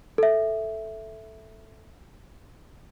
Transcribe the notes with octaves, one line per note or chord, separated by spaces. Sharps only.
A4 E5